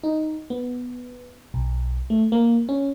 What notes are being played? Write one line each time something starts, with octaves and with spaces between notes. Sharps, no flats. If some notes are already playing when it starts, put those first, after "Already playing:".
D#4
B3
B1
A3
A#3
C#4